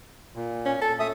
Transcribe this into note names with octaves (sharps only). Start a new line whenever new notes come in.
A#2
C#4
A4
A3 E5 D#6